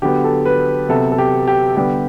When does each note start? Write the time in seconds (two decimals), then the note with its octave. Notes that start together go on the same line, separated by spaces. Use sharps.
0.02 D3 F#3 B3 G4
0.24 A4
0.46 B4
0.89 C3 F#3 B3 A4
1.12 A4
1.18 G4
1.48 G4
1.76 D3 G3 B3 G4